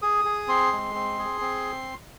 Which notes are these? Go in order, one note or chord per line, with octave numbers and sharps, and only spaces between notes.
G#4 D#6
G#4
C4 C6
G#3
C4
G#4
C4